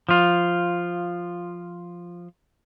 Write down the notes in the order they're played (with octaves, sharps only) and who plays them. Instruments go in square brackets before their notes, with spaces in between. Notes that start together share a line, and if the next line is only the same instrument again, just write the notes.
[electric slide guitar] F3 F4